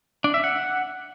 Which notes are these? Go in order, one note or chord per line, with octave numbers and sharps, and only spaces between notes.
D4
E5
F#5